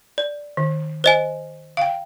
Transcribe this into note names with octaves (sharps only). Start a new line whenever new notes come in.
D5
D#3
C5 D#5 G#5
F5 G5